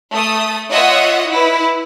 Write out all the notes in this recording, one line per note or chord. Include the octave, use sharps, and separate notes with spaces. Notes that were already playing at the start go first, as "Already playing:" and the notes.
A3 D#6
F4 C#5 D#5 E5 F#5 D#6
E4 B4